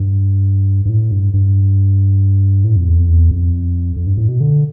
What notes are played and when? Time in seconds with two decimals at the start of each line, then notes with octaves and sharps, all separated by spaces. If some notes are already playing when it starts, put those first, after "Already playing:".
Already playing: G2
0.85 G2
0.89 A2
1.11 G2
1.33 G2
2.64 A2
2.76 F2
2.87 E2
2.97 F2
3.08 E2
3.31 F2
3.96 F2
4.07 G2
4.18 A2
4.28 B2
4.40 D3